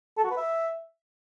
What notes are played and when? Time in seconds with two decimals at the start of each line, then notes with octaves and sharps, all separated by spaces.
0.17 A4
0.24 F#4
0.30 B4
0.37 E5